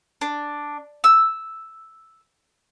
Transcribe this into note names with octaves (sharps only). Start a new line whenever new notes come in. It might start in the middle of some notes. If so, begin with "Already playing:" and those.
D4
E6